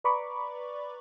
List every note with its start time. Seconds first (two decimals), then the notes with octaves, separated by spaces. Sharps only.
0.04 B4 D5 A#5 B5 C#6 D6